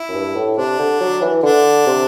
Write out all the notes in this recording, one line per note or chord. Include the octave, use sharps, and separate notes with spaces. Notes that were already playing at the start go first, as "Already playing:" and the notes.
Already playing: E4
F#2
G2
A2
C3 D4
D3
F#3
E3
D3 D4
C3